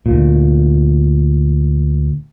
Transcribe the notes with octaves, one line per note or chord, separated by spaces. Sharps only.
D2 A#2